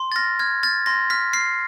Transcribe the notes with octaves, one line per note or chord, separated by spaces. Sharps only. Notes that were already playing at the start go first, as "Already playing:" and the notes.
Already playing: C6
A6
F6 A#6
F6 G#6
F6 A6
C6 A#6
F6 B6
F6 C7